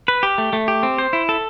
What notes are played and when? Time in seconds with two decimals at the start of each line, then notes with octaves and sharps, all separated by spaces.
0.08 B4
0.23 G4
0.38 A3
0.53 A3
0.68 G4
0.83 C4
0.98 C5
1.13 E4
1.29 A4